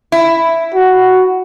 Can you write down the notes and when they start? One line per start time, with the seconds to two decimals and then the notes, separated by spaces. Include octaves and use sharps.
0.12 E4
0.74 F#4